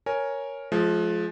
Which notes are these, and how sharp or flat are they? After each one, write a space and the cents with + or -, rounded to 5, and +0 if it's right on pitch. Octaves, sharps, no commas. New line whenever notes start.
A#4 +5 C#5 +0 G#5 +5
F3 +0 G#3 +35